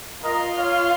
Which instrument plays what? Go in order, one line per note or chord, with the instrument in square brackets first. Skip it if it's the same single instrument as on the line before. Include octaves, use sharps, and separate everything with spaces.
[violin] F4 [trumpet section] A#4 D#5
[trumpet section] C#5 F5